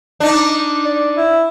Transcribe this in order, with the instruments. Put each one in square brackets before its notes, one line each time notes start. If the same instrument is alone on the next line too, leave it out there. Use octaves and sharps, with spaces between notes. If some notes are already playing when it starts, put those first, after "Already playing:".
[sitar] D4 D#4
[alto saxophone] D5
E4